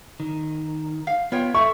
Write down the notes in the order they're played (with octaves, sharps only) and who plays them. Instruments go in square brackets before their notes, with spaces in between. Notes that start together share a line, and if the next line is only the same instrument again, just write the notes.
[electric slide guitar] D#3
[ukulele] F5
[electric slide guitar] B3 [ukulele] F4 C#5 G5
[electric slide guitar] A4 [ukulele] E5 [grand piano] C#6